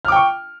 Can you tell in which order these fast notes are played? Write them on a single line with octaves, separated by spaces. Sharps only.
F6 D6 G5 C#6